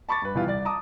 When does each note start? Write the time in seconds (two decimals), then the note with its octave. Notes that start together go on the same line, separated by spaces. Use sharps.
0.09 A5 B5 C#6 D6 A6
0.22 G2 B4
0.35 B2 E3 G3 E4 F4
0.47 C2 D5 A6
0.65 A5 A#5 D6 D#6